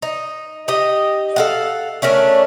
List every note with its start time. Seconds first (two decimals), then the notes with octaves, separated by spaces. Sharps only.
0.02 D#4
0.68 D#4 G4 D#5
1.36 A4 F5 F#5
2.02 A3 C#4 D4 A#4